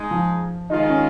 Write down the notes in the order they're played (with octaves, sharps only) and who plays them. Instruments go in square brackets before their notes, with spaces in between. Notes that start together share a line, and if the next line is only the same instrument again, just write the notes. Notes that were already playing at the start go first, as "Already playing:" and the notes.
Already playing: [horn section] G#3 D#4 G#4
[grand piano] F3
[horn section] D#3 G#3 F4 [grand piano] D#4
[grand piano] D#4
C#4